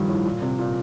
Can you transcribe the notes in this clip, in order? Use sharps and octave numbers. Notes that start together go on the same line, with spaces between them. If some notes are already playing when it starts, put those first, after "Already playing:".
Already playing: G2 D#3 F3 G3
A2
A#2
C3
A#2